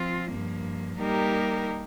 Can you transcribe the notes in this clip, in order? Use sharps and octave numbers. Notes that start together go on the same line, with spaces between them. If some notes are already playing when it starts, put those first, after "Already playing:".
Already playing: F3 C4 F4
G2 F3 A#3
G3 A#3 D#4 G4 A#4